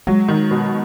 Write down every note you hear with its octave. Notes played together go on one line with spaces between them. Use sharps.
F#3 G#3
D#3
B2